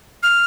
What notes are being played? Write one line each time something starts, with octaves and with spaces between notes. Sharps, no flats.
F6